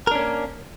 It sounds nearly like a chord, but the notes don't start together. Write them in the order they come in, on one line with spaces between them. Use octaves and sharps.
A#4 D4 C#4 A#3